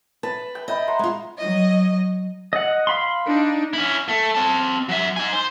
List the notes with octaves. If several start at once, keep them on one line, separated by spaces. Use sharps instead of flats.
B4 A5
G5
D#5 E5 G5 B5
C5 F#5 A#5
G#3 F4
F#3 D#5
D#5 F#5
F5 B5 C6
D4 D#4
C#4 E4
A3
C4 A5
F#3 E5
D#4 G#5
C5